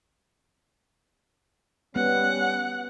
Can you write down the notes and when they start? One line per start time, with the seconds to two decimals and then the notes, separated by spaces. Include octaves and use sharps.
1.96 G3 B3 C#4 F#5